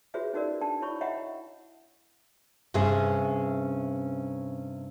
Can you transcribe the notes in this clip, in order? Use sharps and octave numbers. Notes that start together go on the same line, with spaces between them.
F4 F#4 G#4 B4 C#5 E5
C#4 D#4 F#4 A#4 D5
D4 G5 A5
E4 C#5 B5 C#6
C#5 D#5 E5 F#5 G5 A#5
G2 C3 C#4 G#4 E5